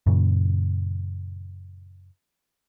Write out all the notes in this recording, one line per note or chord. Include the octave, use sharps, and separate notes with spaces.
F#2 A#2 C#3